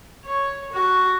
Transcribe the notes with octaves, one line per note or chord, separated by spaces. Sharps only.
C#5
F#4